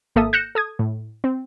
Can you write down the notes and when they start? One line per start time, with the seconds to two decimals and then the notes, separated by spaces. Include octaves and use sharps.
0.16 G#1 A#3 A4 E5 D#6
0.33 F#6 G6 A#6 C#7 E7
0.55 A4 D#6 G#6
0.79 A2
1.24 C4